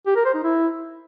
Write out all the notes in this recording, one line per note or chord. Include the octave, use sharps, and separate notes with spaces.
G4
A#4
C5
D#4
E4